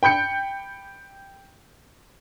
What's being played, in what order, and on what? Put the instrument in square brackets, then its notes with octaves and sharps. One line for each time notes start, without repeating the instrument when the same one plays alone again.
[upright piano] G5 B5 G6 C#7